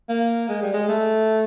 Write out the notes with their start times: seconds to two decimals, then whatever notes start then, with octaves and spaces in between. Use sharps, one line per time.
0.09 A#3
0.49 G#3
0.62 G3
0.74 G#3
0.89 A3